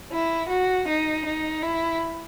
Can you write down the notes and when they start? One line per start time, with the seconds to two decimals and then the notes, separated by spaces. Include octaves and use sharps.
0.12 E4
0.49 F#4
0.88 D#4
1.26 D#4
1.63 E4